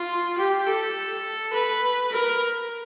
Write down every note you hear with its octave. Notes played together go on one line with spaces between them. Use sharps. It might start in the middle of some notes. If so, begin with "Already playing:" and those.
Already playing: F4
G4
A4
B4
A#4